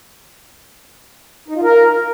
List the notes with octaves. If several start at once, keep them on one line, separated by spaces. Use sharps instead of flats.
D#4
F4
A#4